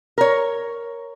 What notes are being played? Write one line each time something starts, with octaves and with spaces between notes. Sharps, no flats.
A#4 C#5